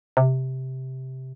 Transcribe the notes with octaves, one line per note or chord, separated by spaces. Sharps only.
C3